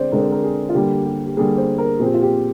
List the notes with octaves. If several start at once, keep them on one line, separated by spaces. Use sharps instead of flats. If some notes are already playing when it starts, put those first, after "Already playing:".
Already playing: D3 G#3 C4 C5 D5
D3 G#3 C4 A#4
C5
A#4
G#4
F4
D3 G3 A#3 G4
G4
G4
D3 G3 A#3 G#4
C5
A#4
A#2 F3 C4 G#4
G4
F4
G4